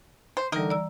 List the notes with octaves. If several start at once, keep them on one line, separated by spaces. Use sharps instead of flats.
C5
D3 E3 G3 D#4 A#4
D5 A#5 E6